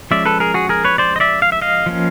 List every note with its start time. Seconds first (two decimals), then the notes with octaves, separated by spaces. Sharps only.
0.11 F3 G#3 C#4 D5 E5
0.25 A4 B4
0.40 G#4 A#4
0.54 F#4 G#4
0.69 G#4 A#4
0.84 B4 C#5
0.98 C5 D5
1.16 D#5
1.20 D5 E5
1.42 F5
1.52 E5
1.61 D#5 F5
1.86 F3 A#3 C#4